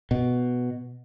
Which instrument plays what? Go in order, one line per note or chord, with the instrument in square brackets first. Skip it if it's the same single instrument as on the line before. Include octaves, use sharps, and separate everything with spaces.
[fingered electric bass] B2